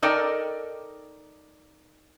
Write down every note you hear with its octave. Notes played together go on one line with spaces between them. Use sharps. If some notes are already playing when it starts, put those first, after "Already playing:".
D#4 A4 A#4 D5 D#5 G5